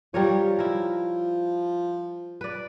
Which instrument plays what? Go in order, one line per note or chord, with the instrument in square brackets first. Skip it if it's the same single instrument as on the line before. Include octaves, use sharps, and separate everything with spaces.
[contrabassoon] F3 [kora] G3 A#4 C#5
[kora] E4 A#4
B4 D5